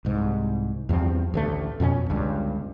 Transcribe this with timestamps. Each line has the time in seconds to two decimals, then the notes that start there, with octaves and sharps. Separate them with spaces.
0.05 C2 G#2
0.89 E2 G2 F3 C4
1.34 A1 D2 A3
1.80 F2 B2 C4 C#4
2.10 G1 C#2 G2